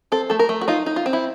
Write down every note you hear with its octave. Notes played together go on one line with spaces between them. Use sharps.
C4 A4
A3 A4
A#4
A3
F#4
D#4 F4
D#4
F4
C4
E4